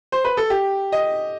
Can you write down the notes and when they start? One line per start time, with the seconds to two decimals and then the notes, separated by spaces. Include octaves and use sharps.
0.12 C5
0.24 B4
0.37 A4
0.50 G4
0.92 D#5